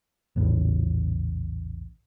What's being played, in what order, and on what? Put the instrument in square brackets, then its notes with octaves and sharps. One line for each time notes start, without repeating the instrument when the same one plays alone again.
[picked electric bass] A#1 E2 A2 C#3